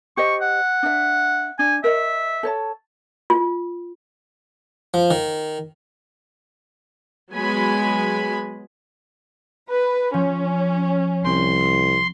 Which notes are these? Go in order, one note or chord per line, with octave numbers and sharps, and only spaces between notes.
G4 C5 D#5 C#6
F#5
D4 E5
D4 G#5
A#4 C#5 D#5 E5
A4 C#5 A5
F4
F3
D#3
F#3 G#3 B3 G#5 B5
B4
F3 C#4
C2 C4 C6